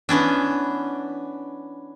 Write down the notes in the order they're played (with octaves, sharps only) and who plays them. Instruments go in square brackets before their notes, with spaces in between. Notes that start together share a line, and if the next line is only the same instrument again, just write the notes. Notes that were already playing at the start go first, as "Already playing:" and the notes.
[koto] E3 B3 C#4 D4